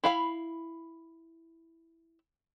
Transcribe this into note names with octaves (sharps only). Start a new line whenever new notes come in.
E4 F5 B5